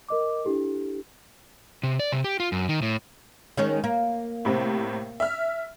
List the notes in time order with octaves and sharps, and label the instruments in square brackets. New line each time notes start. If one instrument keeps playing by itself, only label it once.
[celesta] A#4 D#5 D6
D4 E4 G4 A4
[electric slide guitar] C3
D5
C3
G4
F4
F#2
D#3
A2
[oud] D#3 G#3 C#4
A#3
[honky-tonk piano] A2 C3 C4
E5 F6